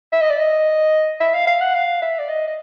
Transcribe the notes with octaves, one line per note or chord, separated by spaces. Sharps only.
E5
D#5
D5
D#5
E5
F5
F5
F#5
F5
E5
D5
D#5
D#5